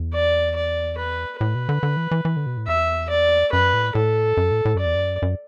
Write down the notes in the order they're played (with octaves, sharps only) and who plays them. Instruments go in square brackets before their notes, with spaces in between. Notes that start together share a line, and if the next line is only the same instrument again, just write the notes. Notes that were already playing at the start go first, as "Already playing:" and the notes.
Already playing: [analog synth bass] E2
[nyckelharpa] D5
D5
B4
[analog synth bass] A2 [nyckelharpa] B4
[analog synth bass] B2
D3
D3
E3
E3
E3
D3
B2
A2
[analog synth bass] E2 [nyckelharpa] E5
[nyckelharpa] D5
[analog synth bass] F#2 [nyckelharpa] B4
[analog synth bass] A2
[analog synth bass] A2 [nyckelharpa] A4
[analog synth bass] F#2
A2
A2
F#2
[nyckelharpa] D5
[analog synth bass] E2
F#2
F#2